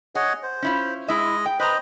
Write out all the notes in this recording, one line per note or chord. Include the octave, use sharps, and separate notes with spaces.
G#4 C#5 D#5 F#5
C5
C#4 E4 F4
G#3 E4 D#5 E5
G5
B4 C5 D#5 A#5